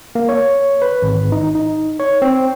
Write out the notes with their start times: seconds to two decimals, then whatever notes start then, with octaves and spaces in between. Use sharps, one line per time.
0.15 A#3
0.29 C#5
0.82 B4
1.02 G#1
1.32 D#4
1.55 D#4
2.00 C#5
2.22 C4